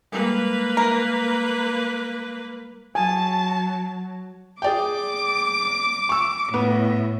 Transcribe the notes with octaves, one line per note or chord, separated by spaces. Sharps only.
G3 G#3 A#3 B4
A#4
F#3 G#5 A5
G#4 D5 G5 D6
C#6 E6
A2 B3